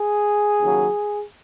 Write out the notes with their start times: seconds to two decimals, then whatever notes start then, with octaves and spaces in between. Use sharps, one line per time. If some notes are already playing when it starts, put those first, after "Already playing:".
Already playing: G#4
0.61 D#2 C#3 F#3